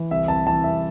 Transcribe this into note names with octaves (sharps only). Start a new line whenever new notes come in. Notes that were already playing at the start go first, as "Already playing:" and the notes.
Already playing: E3
C2 E5
C2 A5
E3 A5
C2 E5